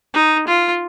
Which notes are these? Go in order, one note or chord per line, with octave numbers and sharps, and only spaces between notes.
D#4
F4